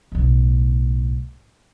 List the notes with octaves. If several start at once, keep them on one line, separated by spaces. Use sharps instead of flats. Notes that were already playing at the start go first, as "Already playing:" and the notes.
B1 A2